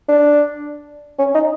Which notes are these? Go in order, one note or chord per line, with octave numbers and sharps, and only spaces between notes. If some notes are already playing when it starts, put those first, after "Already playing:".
D4
C#4
D#4